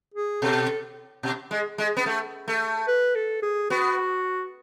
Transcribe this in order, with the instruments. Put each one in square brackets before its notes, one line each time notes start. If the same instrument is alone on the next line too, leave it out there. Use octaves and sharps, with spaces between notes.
[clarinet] G#4
[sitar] B2 [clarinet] A4
[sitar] B2
G#3
G#3
B3
A3
A3
[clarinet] B4
A4
G#4
[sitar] B3 [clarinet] F#4